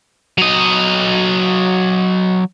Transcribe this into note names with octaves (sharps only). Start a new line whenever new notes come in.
F#3 D#5